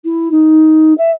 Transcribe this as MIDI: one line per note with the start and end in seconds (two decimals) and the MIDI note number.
0.04 0.31 64
0.31 0.93 63
0.97 1.10 76